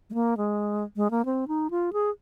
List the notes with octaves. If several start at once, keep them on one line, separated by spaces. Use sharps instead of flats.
G#3
A#3
G#3
G#3
A#3
C4
D#4
F4
G#4